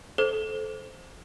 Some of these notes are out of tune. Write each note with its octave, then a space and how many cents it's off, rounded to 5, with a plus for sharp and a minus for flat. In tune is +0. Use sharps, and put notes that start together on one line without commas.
A4 -20 C5 +0